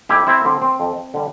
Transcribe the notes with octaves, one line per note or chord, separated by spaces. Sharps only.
F2 E4 G4
C4 E4
D3 G3 C4
C4
F2
D3 G3